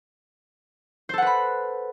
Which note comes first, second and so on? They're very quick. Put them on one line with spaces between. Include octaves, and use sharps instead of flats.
C5 A4 F#5 B4 B5